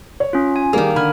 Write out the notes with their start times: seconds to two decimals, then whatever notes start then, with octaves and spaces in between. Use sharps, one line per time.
0.20 C#5
0.33 C#4 F4
0.56 G#5
0.73 D#3 G3 A#3 G4 G#4
0.96 D3 G#5 B5 F6